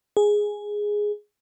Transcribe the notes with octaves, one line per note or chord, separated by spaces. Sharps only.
G#4